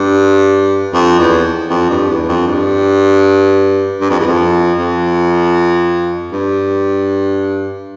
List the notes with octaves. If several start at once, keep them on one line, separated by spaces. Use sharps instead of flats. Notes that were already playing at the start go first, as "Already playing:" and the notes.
Already playing: G2
F2
E2
F2
G2
E2
F2
G2
G2
F2
E2
F2
F2
G2